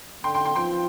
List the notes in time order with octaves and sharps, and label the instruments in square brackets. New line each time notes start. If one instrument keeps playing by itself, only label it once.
[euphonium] D3 [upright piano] G5 C6
[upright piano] G5 C6
G5 C6
[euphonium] F3 [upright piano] G5 C6